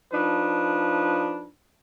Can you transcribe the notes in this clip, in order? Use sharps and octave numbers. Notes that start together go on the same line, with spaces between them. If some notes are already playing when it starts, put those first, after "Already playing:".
F3 D4 D#4 B4